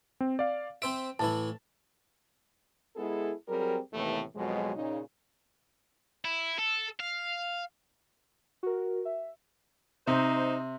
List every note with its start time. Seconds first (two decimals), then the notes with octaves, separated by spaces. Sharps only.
0.20 C4
0.39 D5 F5
0.82 C4 C5 E5 D7
1.19 A2 E3 E4 A5
2.96 G#3 B3 E4 G#4 A4
3.48 F#3 G3 C4 G#4 A#4
3.93 D#2 A2 C3 E3 A3 B3
4.35 F2 B2 F#3 G#3
4.76 A#2 C#3 D#4
6.25 E4
6.59 A4
7.00 F5
8.63 F#4 A#4
9.05 E5
10.07 C3 D#4 C5